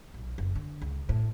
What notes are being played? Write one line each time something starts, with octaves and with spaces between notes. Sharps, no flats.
B1
F#1
D3
C#2
A2